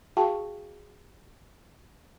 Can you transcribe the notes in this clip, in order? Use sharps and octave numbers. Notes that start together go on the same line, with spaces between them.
F#4 G#4 F5 G5 A5 C#6